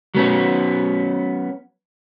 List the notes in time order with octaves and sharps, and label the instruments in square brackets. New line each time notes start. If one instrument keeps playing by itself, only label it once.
[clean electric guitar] F#3 B3 C#4